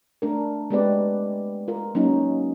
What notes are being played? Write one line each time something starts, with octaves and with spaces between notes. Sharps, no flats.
A3 D4 A#4
G#3 B3 C4 G4 B4 D5
F4 A#4
F#3 A#3 C#4 D#4